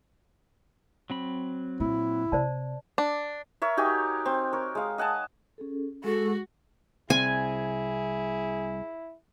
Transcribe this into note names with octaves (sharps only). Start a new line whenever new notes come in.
F#3 C4 B5
A#2 E4
C3 C5 D5 A5
D4
A#4 C#5 E5
D#4 F#4 G4 G#5
C4
A#4 C#5
G#3 F5
D#5 F#5 G#5 A5
C#4 G#4 A4
G#3 F#4 G#4 A4
C2 C4 E4 G#4 G#5